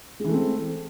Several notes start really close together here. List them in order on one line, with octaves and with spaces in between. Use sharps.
G#3 E3 A3 C4